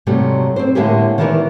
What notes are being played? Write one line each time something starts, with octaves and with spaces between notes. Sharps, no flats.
G#2 C3 F#3 G3 A3
C4 C5
A2 D3 G#3 A#3 G4 G#4
D#3 E3 B3 E4 A#4 D5